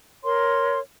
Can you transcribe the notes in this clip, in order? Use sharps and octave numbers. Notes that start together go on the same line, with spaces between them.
A#4 C#5 C6